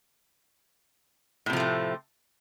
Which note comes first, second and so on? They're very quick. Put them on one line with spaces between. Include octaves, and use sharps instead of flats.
A2 C3 F3 A3 C4